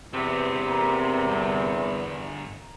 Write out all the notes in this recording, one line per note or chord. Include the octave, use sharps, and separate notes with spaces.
E2 C3 C4 B4
A#4
G2 D3